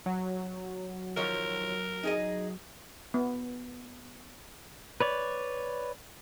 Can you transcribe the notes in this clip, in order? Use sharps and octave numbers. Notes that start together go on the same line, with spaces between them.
F#3
D#3 F3 A#4 C#5
D#4 G#4 D#5
B3
B4 C#5 D5